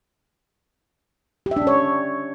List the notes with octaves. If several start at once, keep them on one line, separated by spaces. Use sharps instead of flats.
G4
E5
D4
C#4
C#5